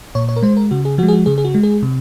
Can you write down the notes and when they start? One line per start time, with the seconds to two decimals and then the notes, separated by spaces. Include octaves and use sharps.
0.15 A#2 C#5
0.29 C#5
0.36 A#4
0.42 G#3 C5
0.57 A#4
0.71 C#3 F#4
0.85 G#4
0.98 F3 G#3 F#4
1.08 G#4
1.13 F#4
1.26 C#3 G#4
1.38 G#4
1.44 F#4
1.54 G#3
1.63 G#4
1.82 C3